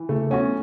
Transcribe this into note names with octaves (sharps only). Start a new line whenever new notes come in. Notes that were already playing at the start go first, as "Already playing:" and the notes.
Already playing: E3
C#3 A3
F#3 B3 C#4 F#4